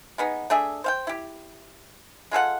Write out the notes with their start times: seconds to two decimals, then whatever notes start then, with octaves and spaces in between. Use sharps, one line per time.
0.18 G#3 B3 D#4
0.50 A3 D4 G#4 E5
0.84 C5 F5 G5
1.07 E4 G4
2.31 G#3 F4 A4 F#5